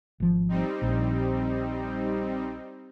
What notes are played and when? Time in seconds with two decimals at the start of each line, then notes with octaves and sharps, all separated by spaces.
0.20 G#1 F3
0.49 G3 C4 D#4
0.82 A#1